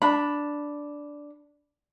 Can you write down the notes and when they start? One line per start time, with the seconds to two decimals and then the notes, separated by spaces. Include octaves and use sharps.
0.02 D4 B5